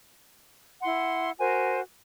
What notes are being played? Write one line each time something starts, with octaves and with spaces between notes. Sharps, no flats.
E4 F#5 C6
F#4 A#4 C5 G#5